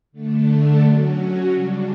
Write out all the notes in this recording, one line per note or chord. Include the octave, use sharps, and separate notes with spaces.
D3 A3 D4
F#3 C#4 F#4
C#3 G3 D4